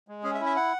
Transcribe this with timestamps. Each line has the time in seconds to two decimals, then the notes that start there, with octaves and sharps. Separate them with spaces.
0.08 G#3
0.23 C#4 G#4
0.34 E5
0.40 E4
0.46 E5
0.56 F#5